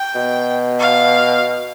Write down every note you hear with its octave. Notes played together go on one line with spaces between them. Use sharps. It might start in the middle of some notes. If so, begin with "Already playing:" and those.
Already playing: G5
B2
F5